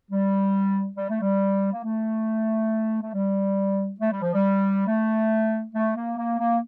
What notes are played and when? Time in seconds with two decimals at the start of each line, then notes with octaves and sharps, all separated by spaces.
0.10 G3
0.96 G3
1.10 A3
1.21 G3
1.73 A#3
1.84 A3
3.02 A3
3.14 G3
4.01 A3
4.11 G3
4.22 F3
4.34 G3
4.87 A3
5.73 A3
5.96 A#3
6.17 A#3
6.39 A#3